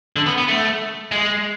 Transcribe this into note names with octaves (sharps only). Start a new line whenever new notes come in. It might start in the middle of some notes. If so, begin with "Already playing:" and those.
D3
B3
B3
A3
G#3